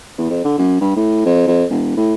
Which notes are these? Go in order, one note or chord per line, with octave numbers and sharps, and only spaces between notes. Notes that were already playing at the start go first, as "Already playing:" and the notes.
E2
F2
D3
F#2
G2
A2
F2
F2
E1
A2